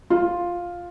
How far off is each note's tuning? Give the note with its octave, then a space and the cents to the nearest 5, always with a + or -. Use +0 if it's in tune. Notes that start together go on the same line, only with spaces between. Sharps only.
F4 +5